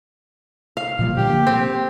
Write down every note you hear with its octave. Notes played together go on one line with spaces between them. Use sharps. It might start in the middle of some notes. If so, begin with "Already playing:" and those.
F5
A#2 F3 G3
D3 G4
A#3
C4